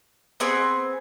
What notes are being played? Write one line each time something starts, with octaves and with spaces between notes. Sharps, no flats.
B3 C4 G#4